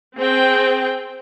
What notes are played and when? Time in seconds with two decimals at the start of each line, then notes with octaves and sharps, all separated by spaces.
0.18 C4 G#4 G5